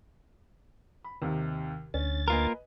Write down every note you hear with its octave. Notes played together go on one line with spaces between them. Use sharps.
B5
D#2 C3 D#3
D2 C#4 A6
A#3 F4 A#4 B4 D#5 G#5